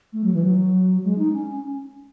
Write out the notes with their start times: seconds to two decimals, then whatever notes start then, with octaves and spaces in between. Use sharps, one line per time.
0.13 A3
0.24 F#3
0.34 E3
0.43 F#3
1.04 G#3
1.18 D#4
1.33 C#4